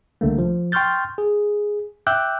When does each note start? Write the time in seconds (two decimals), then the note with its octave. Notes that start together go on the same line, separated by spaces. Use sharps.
0.21 C2 D3 A3 A#3
0.38 F3
0.72 G5 C6 C#6 F6 G6 A6
1.18 G#4
2.07 E5 G5 D6 E6 F#6 G6